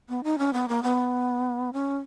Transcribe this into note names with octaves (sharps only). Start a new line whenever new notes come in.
B3
D#4
C#4
B3
A#3
B3
C#4